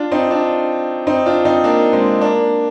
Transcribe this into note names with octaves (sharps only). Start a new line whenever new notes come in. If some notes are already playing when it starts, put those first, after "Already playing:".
Already playing: D4 F4
C4 D#4
D4 F4
C4 D#4
D4 F4
C4 D#4
A#3 D4
G#3 C4
A#3 D4